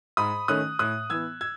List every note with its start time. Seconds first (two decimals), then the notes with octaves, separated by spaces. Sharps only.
0.17 G#2 B5 D#6
0.48 D#3 A3 C#4 D#6 F#6
0.79 A2 D#6 F#6
1.10 E3 B3 E6 G#6
1.41 E6 G#6